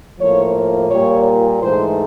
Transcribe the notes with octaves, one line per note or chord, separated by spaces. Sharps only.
A2 F3 A#3 C#5
A#2 G3 A#3 C#5
G#2 E3 A3 C5